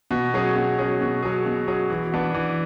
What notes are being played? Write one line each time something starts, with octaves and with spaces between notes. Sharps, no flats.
B2
F#3 C#4 G#4
B2
F#3 C#4 G#4
B2
F#3 C#4 G#4
B2
F#3 C#4 G#4
E3
B3 D4 F#4
E3